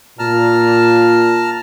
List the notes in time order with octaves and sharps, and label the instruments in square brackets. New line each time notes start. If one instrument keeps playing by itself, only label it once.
[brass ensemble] A#2 [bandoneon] A5 A#5 F6